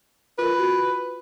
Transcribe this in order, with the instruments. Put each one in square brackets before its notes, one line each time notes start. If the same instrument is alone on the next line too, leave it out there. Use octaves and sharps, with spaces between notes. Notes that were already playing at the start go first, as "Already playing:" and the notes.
[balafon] F4 A#4 [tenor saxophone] B4
[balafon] F#4